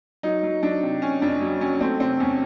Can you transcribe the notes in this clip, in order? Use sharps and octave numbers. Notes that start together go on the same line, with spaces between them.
F#3 D#4
F#3
F#3 D4
C3
C3 C#4
F2 D4
F#3
F#3 C#4
A3 C4
C3 C4
E2 C#4